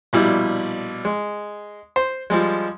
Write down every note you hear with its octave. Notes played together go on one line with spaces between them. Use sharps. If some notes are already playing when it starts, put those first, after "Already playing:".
A#1 B2 G3 E4
G#3
C5
F3 G3 G#3